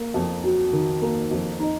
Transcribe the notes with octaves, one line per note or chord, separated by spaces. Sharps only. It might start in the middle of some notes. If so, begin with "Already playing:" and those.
Already playing: A#3
F2
F#3
D#3
A#3
F2
D#4